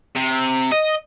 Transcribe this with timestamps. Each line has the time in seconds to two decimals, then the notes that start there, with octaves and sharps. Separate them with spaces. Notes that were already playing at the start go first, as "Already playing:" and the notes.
0.15 C3
0.72 D#5